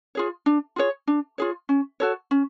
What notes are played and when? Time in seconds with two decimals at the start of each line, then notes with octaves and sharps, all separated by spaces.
0.15 F4 G#4 C#5
0.46 D4
0.76 F4 G#4 C#5
1.07 D4
1.38 F4 G#4 C#5
1.69 C#4
2.00 F#4 A4 C#5
2.31 C#4